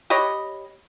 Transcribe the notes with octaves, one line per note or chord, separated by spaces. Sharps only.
G4 B4 C#5 D#5